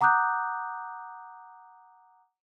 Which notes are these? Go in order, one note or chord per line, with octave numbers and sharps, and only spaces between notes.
F#5 A#5 D6 D#6 F#6 G6